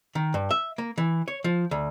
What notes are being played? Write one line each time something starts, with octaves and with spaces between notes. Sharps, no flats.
D#3
G2
E5
A#3
E3
C#5
F3
D2